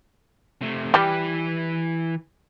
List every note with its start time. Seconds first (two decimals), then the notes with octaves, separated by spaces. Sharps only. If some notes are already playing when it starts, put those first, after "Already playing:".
0.61 C3 A3
0.94 E3 G3 G4 B4